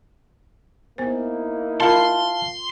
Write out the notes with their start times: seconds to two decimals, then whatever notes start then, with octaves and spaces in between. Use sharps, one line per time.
0.98 A#3 B3 D#4 E4 C5
1.80 F4 A#4 F5 A5 B5 C6